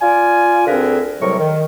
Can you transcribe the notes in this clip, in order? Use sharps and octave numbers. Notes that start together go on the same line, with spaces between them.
F4 D5 G#5
D2 D3 C4 G#4 A#4 B4
A2 C3 F#3 G3 A#4 C#6
D#3